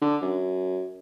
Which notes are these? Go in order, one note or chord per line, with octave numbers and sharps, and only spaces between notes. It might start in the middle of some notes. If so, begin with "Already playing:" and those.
D3
F#2